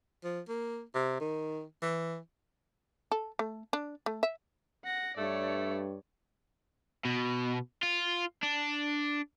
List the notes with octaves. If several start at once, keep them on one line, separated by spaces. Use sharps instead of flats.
F3
A#3
C3
D#3
E3
A4
A3
D4
A3
E5
F#5 A#6
G2 A3 C#5 D5
B2
F4
D4